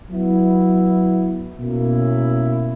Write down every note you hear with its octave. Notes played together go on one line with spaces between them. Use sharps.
F#3 B3 E4
B2 A#3 C#4 E4